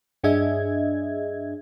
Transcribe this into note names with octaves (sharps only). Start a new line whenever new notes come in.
G2 D4 G#4 D#5 E5 G#6